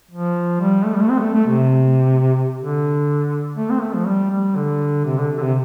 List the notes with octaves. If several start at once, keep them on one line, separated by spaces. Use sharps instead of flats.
F3
G3
A3
G3
A3
C4
G3
A3
A3
C3
D3
A3
C4
A3
F3
G3
G3
D3
C3
D3
D3
C3